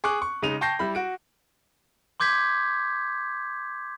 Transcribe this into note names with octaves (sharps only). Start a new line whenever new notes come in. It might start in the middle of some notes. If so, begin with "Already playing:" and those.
G#4 C#6 D6 F#6
C#6
C#3 G#3 D#4 D#7 F7
G5 A5 C#6 G6 A#6 C7
G3 E4 B5
F#4 D7
C6 D6 G6 G#6 B6